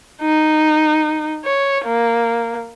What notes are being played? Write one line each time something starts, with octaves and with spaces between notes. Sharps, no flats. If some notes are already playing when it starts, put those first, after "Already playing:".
D#4
C#5
A#3